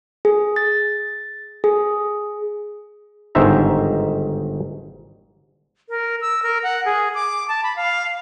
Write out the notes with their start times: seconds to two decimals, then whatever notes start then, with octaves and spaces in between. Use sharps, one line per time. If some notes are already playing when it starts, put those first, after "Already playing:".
0.25 G#4
0.56 A6
1.64 G#4
3.35 G1 G#2 D#3 C5 E5 A#5
5.89 A#4
6.21 E6
6.43 A#4
6.63 F#5
6.85 G#4
7.15 D6
7.48 A5
7.63 B5
7.76 F5